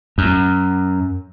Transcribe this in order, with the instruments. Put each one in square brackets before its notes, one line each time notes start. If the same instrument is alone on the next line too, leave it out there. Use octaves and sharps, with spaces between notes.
[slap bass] F#2